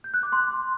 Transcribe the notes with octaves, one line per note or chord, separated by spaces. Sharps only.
G6
F#6
D6
C6